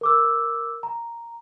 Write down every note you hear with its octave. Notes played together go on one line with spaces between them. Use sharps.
A#4 D6 E6
A#5